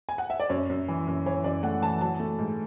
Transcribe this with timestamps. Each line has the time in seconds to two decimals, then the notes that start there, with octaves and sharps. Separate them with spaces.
0.09 G#5
0.18 F#5
0.30 E5
0.40 D5
0.50 F#2 C#5
0.70 F#2
0.88 E3
1.07 F#2
1.26 E3 C#5
1.44 F#2 D5
1.63 A3 F#5
1.82 E3 A5
2.01 F#3 A5
2.20 A3
2.39 G#2